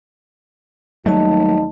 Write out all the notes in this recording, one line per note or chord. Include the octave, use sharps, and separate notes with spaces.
D#2 F#3 G3 A3 D#4 D#5 A5